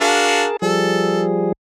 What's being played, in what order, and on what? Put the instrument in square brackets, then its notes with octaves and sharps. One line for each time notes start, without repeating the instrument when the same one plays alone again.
[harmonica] D4 F#4 F5 [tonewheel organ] G#4 A#4 A5
[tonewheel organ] F3 G3 G#4 [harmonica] A4